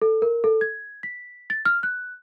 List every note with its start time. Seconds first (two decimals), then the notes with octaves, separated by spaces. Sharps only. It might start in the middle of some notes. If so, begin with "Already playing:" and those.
0.02 A4
0.22 A#4
0.44 A4
0.61 G#6
1.03 B6
1.50 A6
1.65 F6
1.83 F#6